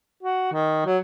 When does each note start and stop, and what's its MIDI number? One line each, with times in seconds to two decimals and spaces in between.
0.23 0.50 66
0.53 0.84 51
0.86 0.98 54